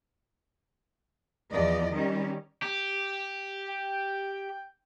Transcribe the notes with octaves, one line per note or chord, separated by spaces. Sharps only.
E2 F3 D5 D#5
D#3 G3 C#4
G4
G5